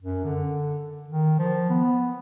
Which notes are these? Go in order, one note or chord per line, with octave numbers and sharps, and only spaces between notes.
F#2
D3
D#3
F3
B3